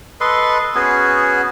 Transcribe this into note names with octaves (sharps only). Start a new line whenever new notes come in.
A4 B4 D#5 C6
B3 C#4 F#4 G#4